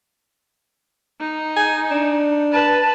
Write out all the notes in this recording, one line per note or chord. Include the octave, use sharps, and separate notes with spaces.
D#4
G#5
D4
B4 A5